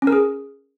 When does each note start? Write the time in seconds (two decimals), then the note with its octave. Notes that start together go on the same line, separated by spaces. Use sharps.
0.02 C#4
0.07 A#4
0.12 G#4